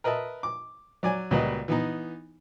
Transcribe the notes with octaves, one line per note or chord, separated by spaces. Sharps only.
A#4 B4 D#5 E5 A5
D6
F#3 D5 G#5
C#2 A#2 G3 F#4 B4 D#5
E3 B3 D#4